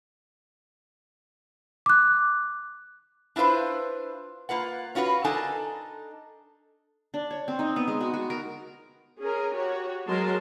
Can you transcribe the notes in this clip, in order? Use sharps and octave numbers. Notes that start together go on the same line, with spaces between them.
D6 F#6
D4 E4 F4 B4 C5
A#3 F4 B4 F#5
C#4 F4 F#4 B4
D4 D#4 A4 A#4 G#5 A5
D4
C#5
C4
D#4
B3
G#3
F#4
F#4
A#4
C#4 G#4 A#4
F#4 G4 C#5
F#3 G#3 G#4 A#4 A5 C6